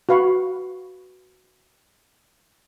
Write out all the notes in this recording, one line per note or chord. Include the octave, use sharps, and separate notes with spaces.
F#4 B4 F5 B5 C#6